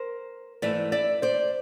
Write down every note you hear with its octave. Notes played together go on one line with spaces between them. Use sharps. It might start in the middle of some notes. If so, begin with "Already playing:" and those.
Already playing: A#4 C5
G#2 E3 A3 D5 E5
D5 E5
C5 D5